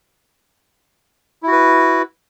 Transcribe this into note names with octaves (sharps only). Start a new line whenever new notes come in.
E4 F#4 B4